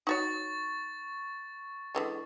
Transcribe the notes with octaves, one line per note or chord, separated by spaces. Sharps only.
D#4 F#4 C#5 C#6 A6
D3 E3 G#3